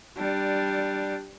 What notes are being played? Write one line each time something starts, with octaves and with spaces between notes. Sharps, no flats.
G3 D4